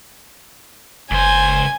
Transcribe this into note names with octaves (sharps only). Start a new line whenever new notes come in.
F#1 C#2 C5 G#5